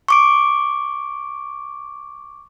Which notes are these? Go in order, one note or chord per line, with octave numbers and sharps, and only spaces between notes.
C#6 D6 D7